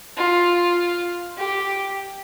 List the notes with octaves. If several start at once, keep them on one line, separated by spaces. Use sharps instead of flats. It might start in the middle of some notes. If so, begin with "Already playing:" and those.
F4
G4